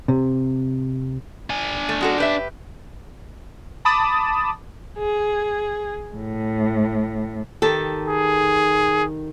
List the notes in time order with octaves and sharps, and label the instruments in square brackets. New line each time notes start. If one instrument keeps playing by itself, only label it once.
[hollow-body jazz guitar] C3
[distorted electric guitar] D4 G#5
[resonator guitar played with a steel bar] A3
G#3 F#4 A4
G4 B4 E5
[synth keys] A5 B5 D6 D#6 A6 E7
[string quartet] G#4
A2
[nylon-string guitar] D#3 G4 A4
[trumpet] G#4